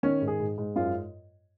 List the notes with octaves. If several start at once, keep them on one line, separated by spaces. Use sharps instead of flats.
D#3 C#4
G#2
G#4
G#2
G#2
F#2 F4